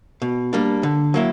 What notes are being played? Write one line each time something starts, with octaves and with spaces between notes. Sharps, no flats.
B2
G3 A#3 D4
D3
F#3 A#3 E4